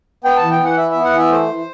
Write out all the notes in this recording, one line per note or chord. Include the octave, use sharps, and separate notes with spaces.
B3 G5
E3 A5
G5
E3
F#5
E4 E5
B3 E5
F#5
E3 E5
A3 C5
E3